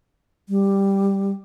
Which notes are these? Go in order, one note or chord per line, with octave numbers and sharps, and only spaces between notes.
G3